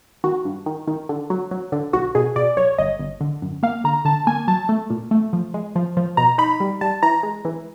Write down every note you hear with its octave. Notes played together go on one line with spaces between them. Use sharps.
D#3 F#4
G2
D#3
D#3
D3
F#3
F#3
D3
B1 F#4
B2 G#4
B2 D5
B1 C#5
G1 D#5
G1
D3
F#2
A#3 F5
D3 A#5
D3 A5
A#3 G#5
F#3 A5
A3
A#2
A3
F3
G#3
F3
F3
B2 A#5
D#4 B5
G3
G3 A5
E3 A#5
G#3
E3